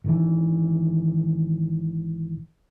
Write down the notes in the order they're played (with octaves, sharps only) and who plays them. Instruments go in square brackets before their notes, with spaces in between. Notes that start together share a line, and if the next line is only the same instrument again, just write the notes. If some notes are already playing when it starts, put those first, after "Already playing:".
[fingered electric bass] G#1 D#3 E3